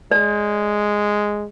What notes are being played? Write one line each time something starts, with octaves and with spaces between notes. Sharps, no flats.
G#3 D5